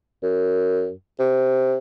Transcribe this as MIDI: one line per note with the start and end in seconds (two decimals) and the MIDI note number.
0.23 0.91 42
1.19 1.76 48